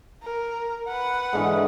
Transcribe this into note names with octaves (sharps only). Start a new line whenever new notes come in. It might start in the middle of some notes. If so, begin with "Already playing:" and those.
A#4
B4 F#5
G#2 D3 E3